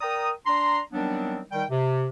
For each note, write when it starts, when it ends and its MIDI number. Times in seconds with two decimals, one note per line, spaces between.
0.01 0.30 70
0.01 0.30 74
0.01 0.30 79
0.01 0.30 82
0.01 0.30 87
0.46 0.79 62
0.46 0.79 82
0.46 0.79 84
0.93 1.39 51
0.93 1.39 54
0.93 1.39 55
0.93 1.39 59
0.93 1.39 60
0.93 1.39 62
1.52 1.63 51
1.52 1.63 55
1.52 1.63 79
1.69 2.07 48